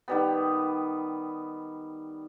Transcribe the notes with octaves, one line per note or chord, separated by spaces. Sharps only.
D#3 G3 B3